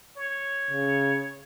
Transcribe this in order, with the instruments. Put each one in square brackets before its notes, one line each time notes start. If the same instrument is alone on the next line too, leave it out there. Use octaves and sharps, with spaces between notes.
[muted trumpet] C#5
[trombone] C#3